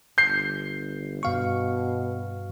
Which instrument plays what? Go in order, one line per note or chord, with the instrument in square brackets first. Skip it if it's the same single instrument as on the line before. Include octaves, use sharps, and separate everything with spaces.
[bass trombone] G1 [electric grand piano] G6 C7
[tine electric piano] G2 F5 C#6 [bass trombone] B2